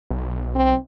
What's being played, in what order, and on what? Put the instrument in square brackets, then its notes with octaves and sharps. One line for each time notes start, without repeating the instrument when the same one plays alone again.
[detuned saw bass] B1
[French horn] C4